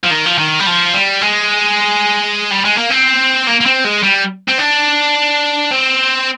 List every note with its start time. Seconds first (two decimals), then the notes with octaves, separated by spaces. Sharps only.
0.04 F3
0.10 D#3
0.26 F3
0.38 D#3
0.60 G3
0.67 F3
0.94 G3
1.22 G#3
2.51 G3
2.65 G#3
2.77 A#3
2.90 C4
3.47 A#3
3.61 A#3
3.66 C4
3.85 G#3
4.03 G3
4.48 C4
4.59 D4
5.71 C4